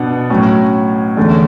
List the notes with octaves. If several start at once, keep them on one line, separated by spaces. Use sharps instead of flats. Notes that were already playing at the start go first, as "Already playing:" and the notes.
Already playing: B2 B3 D4 F#5
A2 F#3 C#4
E2 D3 A3 C#4